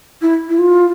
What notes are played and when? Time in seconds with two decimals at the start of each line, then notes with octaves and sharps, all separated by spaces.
0.22 E4
0.49 E4
0.59 F4